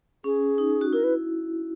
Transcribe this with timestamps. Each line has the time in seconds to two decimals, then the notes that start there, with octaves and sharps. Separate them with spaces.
0.24 C#4 G#4
0.58 D#4
0.81 F#4
0.93 E4 A#4
1.04 B4